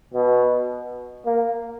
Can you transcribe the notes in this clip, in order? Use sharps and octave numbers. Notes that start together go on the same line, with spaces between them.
B2
A#3